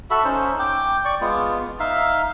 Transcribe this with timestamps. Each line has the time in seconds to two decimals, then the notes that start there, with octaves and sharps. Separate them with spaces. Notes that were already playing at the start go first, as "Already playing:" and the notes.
0.11 F#4 A4 E5 B5
0.24 C#4 D#4 C5
0.59 G5 D6
1.05 D5 C#6
1.21 G#3 B3 F4
1.80 D#4 E5 F5